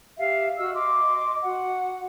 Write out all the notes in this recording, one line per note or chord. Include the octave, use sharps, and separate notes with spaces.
G4 E5 F5
F#4 D#5 E6 F6
D#5 C6 D6
F#4 F#5